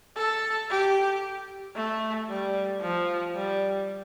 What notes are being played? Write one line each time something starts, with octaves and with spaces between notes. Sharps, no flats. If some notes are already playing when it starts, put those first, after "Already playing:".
A4
G4
A3
G3
F3
G3